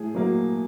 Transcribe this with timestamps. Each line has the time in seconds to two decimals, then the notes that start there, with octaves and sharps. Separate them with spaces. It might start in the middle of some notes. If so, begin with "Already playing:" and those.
Already playing: A2 G#4
0.15 F#3 A#3